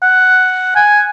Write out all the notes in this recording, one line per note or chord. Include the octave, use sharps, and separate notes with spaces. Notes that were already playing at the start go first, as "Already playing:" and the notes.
F#5
G#5